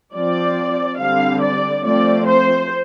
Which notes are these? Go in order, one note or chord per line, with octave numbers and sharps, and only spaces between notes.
F3 C4 D5
D3 G3 C4 F5
D5
F3 A3 C4 D5
C5